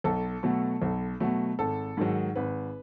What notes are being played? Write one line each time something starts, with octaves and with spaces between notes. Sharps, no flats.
B1 A4
B2 F#3 A3
B1
B2 F#3 A3
G#1 A4
G#2 D#3 F#3
G#1 B4